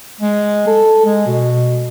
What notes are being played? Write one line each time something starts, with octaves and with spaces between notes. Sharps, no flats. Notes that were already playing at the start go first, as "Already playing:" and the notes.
G#3
A4
G#3
B2